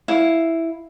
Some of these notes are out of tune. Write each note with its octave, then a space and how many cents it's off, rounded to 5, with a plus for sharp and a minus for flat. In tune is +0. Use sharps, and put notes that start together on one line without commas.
E4 +0 F5 +0